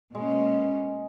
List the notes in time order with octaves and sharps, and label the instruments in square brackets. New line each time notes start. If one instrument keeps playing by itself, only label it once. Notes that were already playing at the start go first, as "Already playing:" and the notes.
[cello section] B2 A#3 C#4 [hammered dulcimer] G#3